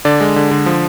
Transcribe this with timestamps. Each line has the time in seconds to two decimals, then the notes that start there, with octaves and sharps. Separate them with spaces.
0.05 D3 D5
0.21 G#3
0.36 D3
0.51 D3
0.66 F3